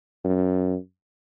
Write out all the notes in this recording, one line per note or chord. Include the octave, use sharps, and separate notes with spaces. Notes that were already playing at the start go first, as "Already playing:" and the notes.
F#2